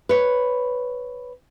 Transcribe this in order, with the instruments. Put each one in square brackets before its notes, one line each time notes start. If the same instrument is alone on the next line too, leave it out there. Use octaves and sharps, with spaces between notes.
[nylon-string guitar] B4 C#5